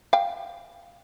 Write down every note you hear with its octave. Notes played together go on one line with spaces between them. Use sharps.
F5 G5